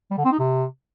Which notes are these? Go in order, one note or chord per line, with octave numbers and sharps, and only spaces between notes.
G3
D3
C4
D#4
C3